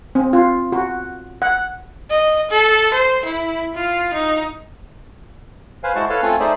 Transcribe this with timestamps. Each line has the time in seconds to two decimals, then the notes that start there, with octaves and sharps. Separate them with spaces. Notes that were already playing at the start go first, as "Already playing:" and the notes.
0.15 C4
0.33 F4
0.72 F#4
1.42 F#5
2.10 D#5
2.51 A4
2.94 C5
3.25 E4
3.75 F4
4.14 D#4
5.84 B4 C5 F5 G#5
5.95 G#3 E4 F#4 C5 A5 C#6
6.09 A4 B4 C#5 F5 A5
6.22 A3 C4 C#4 F4 A4 G#5
6.40 A3 D#4 G#4 C5 D5 E5